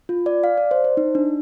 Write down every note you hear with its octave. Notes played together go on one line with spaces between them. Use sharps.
F4
D5
F5
D5
C5
C5
D#4
D4